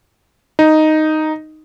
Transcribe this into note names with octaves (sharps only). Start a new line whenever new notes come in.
D#4